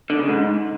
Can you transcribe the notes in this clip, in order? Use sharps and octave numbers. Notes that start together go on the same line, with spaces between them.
D3
C#3
G#2